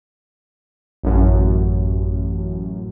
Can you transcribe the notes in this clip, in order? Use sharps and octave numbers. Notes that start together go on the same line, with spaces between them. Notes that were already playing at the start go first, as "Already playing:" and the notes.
A1 F#2